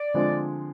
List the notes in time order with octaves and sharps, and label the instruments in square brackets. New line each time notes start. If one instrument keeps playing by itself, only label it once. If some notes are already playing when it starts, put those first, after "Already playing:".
Already playing: [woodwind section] D5
[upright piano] D3 F3 G#3 C4